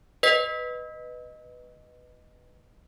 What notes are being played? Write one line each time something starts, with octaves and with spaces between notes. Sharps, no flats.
B4 D#5 B6